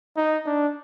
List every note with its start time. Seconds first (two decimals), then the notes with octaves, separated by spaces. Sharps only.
0.17 D#4
0.46 D4